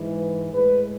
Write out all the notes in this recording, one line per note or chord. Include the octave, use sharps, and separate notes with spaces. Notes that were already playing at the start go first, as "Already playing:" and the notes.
Already playing: G#2 E3 G#3
B4
A2 G#3 B4